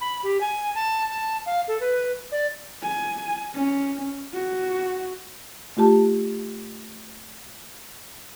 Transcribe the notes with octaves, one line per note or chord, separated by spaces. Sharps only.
B5
G4
G#5
A5
A5
F5
A4
B4
D5
G#5
C#4
F#4
A3 F4 G4 A5